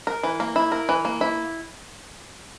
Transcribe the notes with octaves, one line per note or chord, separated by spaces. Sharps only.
A#4
E3
A#3
E4
A#4
E3
A#3
E4